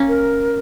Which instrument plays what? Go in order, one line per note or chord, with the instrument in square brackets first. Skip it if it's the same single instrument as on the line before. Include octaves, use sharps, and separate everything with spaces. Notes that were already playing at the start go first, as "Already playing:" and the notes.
Already playing: [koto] A#3 C#4
[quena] A#4